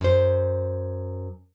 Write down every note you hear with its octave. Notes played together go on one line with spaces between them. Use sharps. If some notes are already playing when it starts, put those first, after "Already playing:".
F#2 C5